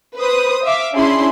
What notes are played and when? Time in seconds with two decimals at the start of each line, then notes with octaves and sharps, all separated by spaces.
0.16 B4 C5 D#6
0.64 E5 F5 D6
0.93 C#4 D4 E4 G#4 B5 C6